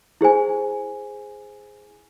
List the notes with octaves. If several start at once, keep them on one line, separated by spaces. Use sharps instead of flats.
E4 G#4 C5 G#5